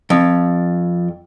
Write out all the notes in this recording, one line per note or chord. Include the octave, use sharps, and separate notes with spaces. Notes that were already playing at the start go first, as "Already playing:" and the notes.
F2